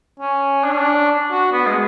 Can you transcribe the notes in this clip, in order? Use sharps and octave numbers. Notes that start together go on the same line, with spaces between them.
C#4
D4
C#4
D4
F#4
B3
G#3